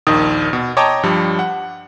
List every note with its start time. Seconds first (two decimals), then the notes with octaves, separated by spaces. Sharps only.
0.07 A#1 D#2 D#3 D#6
0.53 B2
0.77 C#5 D#5 G5 A5 A#5 D6
1.03 G2 F3 G3
1.39 F#5